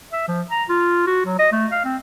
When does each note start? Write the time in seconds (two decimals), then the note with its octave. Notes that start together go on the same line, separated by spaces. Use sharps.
0.13 E5
0.28 F3
0.51 A#5
0.69 F4
1.07 F#4
1.26 F#3
1.39 D#5
1.52 A3
1.72 F5
1.85 C4